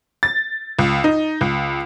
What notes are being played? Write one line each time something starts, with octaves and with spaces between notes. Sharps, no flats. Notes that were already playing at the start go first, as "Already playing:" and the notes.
A6
C#2
D#4
C#2